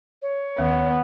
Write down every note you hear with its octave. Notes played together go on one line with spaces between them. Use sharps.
C#5
D#2 D#3 B3